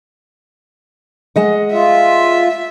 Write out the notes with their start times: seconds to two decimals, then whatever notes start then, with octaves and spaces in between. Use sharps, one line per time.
1.36 G#3 D#5 F#5
1.73 F4 E5